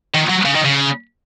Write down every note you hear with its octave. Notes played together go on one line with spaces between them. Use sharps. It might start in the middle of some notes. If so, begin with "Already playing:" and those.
D#3
F#3
C#3
D#3
C#3